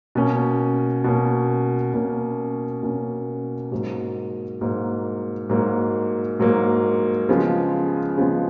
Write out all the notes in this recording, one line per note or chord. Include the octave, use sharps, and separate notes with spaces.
B2 A#3 C#4
B2 A#3 C#4
B2 A#3 C#4
B2 A#3 C#4
G#2 F#3 A#3
G#2 F#3 A#3
G#2 F#3 A#3
G#2 F#3 A#3
C#3 F3 G#3 B3
C#3 F3 G#3 B3